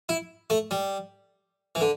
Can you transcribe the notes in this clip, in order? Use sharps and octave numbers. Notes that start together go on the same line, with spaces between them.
E4
A3
G3
E3
D3